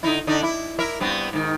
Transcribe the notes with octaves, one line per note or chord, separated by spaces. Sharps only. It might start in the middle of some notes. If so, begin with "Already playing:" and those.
D3 D#4 E4
D3 D4 D#4
E4
E4 A#4 E5
G2 B3 C4
G#2 D#3